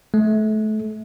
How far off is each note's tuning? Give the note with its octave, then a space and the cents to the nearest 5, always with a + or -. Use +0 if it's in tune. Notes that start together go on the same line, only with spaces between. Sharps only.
A3 -30